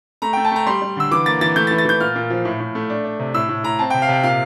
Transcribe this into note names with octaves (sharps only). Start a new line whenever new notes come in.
A3 A#5
G5
A3
A5
A3 A#5
G3 C6
G3
D3 E6
E3 D6
A#3 A6
E3 A6
A3 G6
A6
E3
A6
E3 G6
A#2 F6
A#2
F3
A2
A2
A3
D4
D4
C3
A2 E6
A2
A2 A#5
C4 A5
G5
C3
F5
C3 G5
A#2 F5